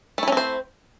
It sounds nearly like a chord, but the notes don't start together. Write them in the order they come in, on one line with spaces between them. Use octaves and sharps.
A3 E4 C#4 C4 C5